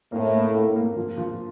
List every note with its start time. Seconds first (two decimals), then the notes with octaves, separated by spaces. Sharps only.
0.12 A2 A#3
0.34 A#3
0.54 A#3
0.76 A#3
0.96 F3
1.17 F3